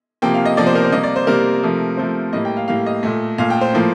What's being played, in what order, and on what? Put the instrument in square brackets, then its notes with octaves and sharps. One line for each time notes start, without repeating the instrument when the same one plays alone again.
[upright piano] C3 F3 A#3 G5
F5
D#5
C3 F3 A#3 D5
C5
A#4
C5
C3 G3 A#3 D#5
D5
C5
C3 G3 A#3 A#4
C3 F3 A3
C3 F3 A3 C5
A2 G3 A#3 D#5
G5
F5
A2 G3 A#3 F5
D#5
A#2 A3
A#2 A3 F5
G5
C5
A2 F3 A#3